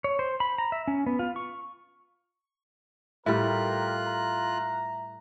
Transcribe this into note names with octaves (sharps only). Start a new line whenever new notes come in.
C#5
C5
B5
A#5
E5
C#4
B3
F4
C#6
A2 G3 F4 G4 A#4 E5 F#6
A#5